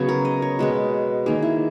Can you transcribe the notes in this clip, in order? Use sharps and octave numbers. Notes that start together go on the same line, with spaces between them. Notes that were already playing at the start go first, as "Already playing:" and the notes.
Already playing: C#3 F#3 B3 C#5
A#4
D#5
C#5
B2 G#3 B3
D#3 A#3 G#4
E4